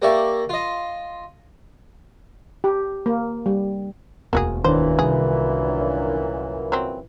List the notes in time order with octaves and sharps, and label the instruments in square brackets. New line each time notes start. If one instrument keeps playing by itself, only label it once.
[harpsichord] A#3 G4 A#4 D5 E5 C#6
F4 D#5
[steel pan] G4
A#3
G3
[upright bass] E1 D2 [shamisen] A#3 F#4 G#4
[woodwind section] F#2 A#2 E3 [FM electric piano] D#3 D4 [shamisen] C5
[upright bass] C2 [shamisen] G#4
[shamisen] F#3 C4